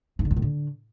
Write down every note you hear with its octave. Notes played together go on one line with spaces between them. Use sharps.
G#2
D3
F#2
A2
D3